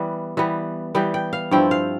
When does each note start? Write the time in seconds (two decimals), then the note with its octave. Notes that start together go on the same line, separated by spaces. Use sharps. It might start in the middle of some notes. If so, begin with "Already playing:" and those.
Already playing: E3 G3 B3
0.37 E3 G3 B3
0.95 E3 G3 B3 G5
1.14 G5
1.33 F5
1.51 G2 F3 C4 E4 G5
1.71 F5